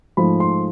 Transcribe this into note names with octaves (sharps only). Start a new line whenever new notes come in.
G#2 F3 A3 B5
C6